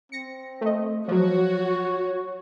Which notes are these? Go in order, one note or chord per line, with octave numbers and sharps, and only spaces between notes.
C4 A#6 C#7
A3 D#5
F3 F#3 F#4 C#5